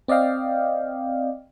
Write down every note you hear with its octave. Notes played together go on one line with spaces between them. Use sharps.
C4 D5 D#5 F5 G5